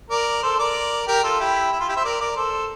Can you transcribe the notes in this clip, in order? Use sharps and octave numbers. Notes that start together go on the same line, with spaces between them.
A#4 D5
A4 C5
A#4 D5
G4 A#4
F4 A4
E4 G4
E4
F4
E4 G4
C5 E5
A#4 D5
A#4 D5
A4 C5